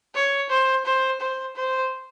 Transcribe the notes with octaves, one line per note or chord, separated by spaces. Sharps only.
C#5
C5
C5
C5
C5